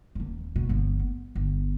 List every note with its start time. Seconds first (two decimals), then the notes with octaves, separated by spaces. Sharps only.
0.15 D#1 D#2
0.56 B2
0.69 G1 F3
0.99 B3
1.35 G1